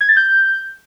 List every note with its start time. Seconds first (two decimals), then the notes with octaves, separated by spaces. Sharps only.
0.01 G#6
0.08 A6
0.16 G6